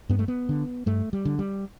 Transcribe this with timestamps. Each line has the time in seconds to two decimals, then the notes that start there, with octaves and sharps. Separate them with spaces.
0.09 G2 B3
0.19 A3
0.28 B3
0.49 D3
0.86 G2 A3
1.13 G3
1.25 D3
1.39 G3